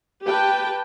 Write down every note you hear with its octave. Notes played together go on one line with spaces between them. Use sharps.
G4 B4 G5 A5